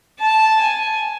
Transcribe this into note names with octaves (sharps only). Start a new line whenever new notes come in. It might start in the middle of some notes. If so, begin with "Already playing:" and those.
A5
G#5